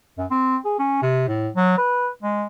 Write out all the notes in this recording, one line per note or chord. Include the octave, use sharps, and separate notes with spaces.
F#2
C4
G#4
C#4
C3
A2
F#3
B4
G#3